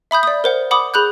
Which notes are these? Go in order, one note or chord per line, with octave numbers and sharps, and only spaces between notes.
E5 B5 D#6 G6
D5 D#6
A#4 C5 F#5
F#5 B5 D6 D#6
G#4 B5 F#6 G6